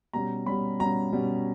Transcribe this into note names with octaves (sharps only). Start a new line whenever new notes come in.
B2 G3 C#4 A#5
B2 G3 C#4 B5
B2 G3 C#4 A#5
B2 G3 C#4